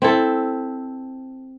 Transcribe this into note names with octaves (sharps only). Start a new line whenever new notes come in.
C4 E4 A4